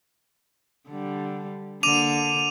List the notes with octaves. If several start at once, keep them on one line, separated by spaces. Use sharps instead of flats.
D3 G3
D3 A#3 D6 D#7 F7